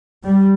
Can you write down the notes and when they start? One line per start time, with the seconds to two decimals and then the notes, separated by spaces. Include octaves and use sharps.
0.23 G3